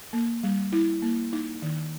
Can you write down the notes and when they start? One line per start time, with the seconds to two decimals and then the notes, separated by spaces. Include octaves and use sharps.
0.13 A#3
0.43 G3
0.72 E4
1.02 A#3
1.33 D#4
1.62 D#3